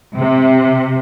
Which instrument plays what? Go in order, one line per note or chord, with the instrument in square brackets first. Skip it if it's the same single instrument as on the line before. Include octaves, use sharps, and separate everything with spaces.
[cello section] C3